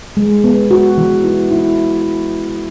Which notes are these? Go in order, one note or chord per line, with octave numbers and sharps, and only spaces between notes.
G#3
B3
F#4
E3
E4
E4